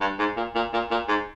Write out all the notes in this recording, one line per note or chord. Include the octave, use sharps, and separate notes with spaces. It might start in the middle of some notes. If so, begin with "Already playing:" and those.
G2
G#2
A#2
A#2
A#2
A#2
G#2